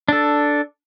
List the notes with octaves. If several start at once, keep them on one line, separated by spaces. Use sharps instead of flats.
D4 A4